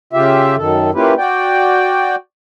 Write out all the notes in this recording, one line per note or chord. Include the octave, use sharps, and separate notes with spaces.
C#3 F4 G4 E5
F#2 D#3 A4
A#3 C#4 E4 F4 G4 B4
F#4 D5 G5